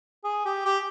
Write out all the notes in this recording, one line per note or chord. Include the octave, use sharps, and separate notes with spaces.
G#4
G4
G4